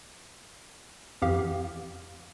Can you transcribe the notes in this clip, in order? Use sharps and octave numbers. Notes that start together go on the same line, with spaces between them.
F2 E3 G4 F5